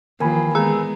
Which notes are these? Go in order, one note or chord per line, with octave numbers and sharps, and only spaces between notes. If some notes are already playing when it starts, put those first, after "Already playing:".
D#2 E3 F3 A#3 A#4 G#5 B5
G#3 B3 G#4 A#5 E6